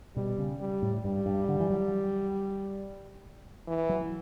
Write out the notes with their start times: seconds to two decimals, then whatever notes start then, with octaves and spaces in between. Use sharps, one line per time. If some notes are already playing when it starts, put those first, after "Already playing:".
0.16 B2 G3
0.38 C#3
0.60 G3
0.82 A2
1.04 G2 G3
1.26 G2
1.48 D3
1.60 E3
1.70 F#3
3.67 E3
3.89 F#3